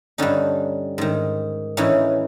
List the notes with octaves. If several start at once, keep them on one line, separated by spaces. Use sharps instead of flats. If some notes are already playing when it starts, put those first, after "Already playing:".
G2 D3 C#4 D#4
G#2 D#3
A2 E3 C#4 D#4